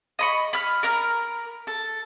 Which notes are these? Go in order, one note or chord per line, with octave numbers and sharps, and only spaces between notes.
D#5 B5 C#6
B5 F6
A#4 A#5 F6
A4